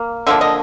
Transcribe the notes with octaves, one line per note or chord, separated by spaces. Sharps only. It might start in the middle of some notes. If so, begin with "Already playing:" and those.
Already playing: A#3
D3 F3 A#3 E5
D#5